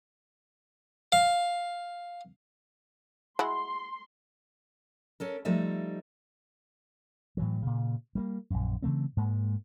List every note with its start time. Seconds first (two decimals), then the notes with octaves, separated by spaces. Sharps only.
1.12 F5
3.39 G#3 E4 F#4 C6
5.20 C#4 A4 A#4
5.45 F3 G3 A3 D#4 D#5 E5
7.37 A2 E3 F#3
7.62 A#2 C#3
8.15 G3 A3 A#3
8.50 A#1 F#2
8.83 C#3 E3 A3 C4
9.17 G#2 G#3 A#3